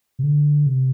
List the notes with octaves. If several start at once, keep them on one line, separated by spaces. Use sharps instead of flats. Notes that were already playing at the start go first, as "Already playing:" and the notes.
C3
D3
C3